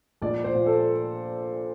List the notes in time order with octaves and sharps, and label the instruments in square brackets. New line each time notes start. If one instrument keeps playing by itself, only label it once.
[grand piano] A#1 D5
C5
A#2
A4